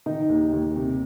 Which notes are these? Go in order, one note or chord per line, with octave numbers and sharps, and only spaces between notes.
D#3 D#4
D#2
D#2
C3